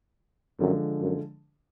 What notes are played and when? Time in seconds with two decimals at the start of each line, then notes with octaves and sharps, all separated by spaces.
0.60 F#2 D3 F3 G#3
1.02 F#2